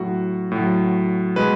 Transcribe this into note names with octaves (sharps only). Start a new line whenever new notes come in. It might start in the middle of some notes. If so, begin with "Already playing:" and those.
Already playing: A2 F#3 F#4
A2 F#3
B2 G#3 B4